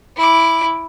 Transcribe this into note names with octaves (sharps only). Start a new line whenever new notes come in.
E4 D6